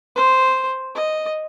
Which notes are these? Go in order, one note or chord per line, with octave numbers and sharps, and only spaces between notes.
C5
D#5